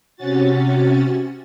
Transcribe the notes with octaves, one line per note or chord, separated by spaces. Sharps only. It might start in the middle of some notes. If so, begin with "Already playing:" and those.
C3 C#4 F#4 A6